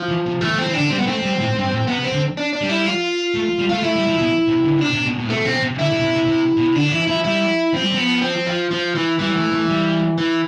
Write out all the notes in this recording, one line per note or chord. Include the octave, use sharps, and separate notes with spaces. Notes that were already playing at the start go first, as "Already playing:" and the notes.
Already playing: F3
E3
C3
E3 A3
F3
C4
E3
D3 D4
G3 C4
B3
A3 C4
G3
A2
G2
A2
C3 B3
C4
D3
D4
D4
G3
E4
F4
A3
G3
A3 F4
A3 E4
G3
F3
B2
C3
D3
D3
C3 D4
C3
B2
B2
A2
B2 A3
B2 C4
C3
D3 E4
C3
C3
C3
C3
B2
C3
D3 D4
E3 E4
F3 E4
G3 E4
F3 C4
G3
F3 B3
C4
F3
F3
E3
E3 G3
A3
A3
G3
E3